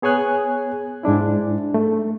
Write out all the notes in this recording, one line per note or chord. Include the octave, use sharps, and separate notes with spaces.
B3 G#4 C#5 G#5 F#6
G#2 G#3 D4 E4
A3